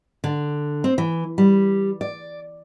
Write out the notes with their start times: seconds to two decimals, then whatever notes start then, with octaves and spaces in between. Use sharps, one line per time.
0.24 D3
0.84 C4
0.98 E3
1.38 G3
2.01 D5